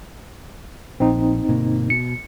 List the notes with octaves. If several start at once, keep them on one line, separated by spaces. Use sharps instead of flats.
A#1 C4 D#4
G1 B2 A#3
B2 C#7